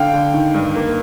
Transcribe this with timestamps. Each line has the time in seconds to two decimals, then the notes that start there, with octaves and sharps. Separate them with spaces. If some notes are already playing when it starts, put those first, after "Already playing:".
Already playing: D3 F5 G5
0.13 D3
0.34 D#3
0.54 G2
0.75 A#3